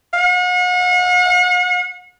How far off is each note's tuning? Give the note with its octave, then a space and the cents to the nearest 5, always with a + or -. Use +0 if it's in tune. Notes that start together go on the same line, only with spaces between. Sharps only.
F#5 -40